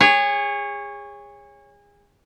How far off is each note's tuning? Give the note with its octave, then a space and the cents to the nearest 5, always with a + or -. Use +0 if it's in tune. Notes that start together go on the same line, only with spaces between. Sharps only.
G#4 -30 C#5 +0